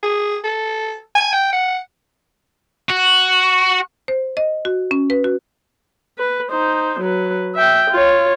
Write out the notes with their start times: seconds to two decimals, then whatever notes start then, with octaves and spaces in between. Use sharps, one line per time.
0.03 G#4
0.44 A4
1.15 G#5
1.33 G5
1.53 F#5
2.90 F#4
4.08 C5
4.37 D#5
4.65 F#4
4.91 C#4
5.10 B4
5.24 F#4
6.18 B4
6.51 D#4 C5
7.00 F#3 B4
7.55 E5 G5
7.91 F4 C#5